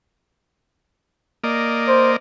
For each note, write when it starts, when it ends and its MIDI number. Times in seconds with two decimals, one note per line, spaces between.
1.44 2.16 58
1.44 2.16 74
1.44 2.16 75
1.88 2.13 72